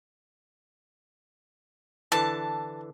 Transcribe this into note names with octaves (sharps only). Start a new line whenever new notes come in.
D3 E3 A5